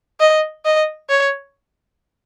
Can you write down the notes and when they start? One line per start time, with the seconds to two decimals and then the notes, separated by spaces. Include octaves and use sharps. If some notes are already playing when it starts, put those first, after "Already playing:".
0.20 D#5
0.65 D#5
1.09 C#5